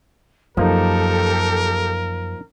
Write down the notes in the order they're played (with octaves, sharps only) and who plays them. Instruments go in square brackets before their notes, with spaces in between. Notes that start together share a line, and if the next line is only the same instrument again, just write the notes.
[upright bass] F#2 [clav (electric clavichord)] F3 A#3 D#4 [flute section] G4 A4 [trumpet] A#4